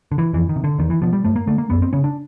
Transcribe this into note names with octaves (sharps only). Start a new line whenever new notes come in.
D3
E3
F2 E3
D#3
C3
D3
E2 D#3
E3
B2 F3
G3
G2 A3
A#3
D3 A3
A#3
F#2 B3
C4
C#3 C#4
D4